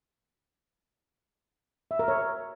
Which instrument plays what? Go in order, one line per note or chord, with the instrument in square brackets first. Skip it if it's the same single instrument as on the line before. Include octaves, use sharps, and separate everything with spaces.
[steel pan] E5
A#4
C#5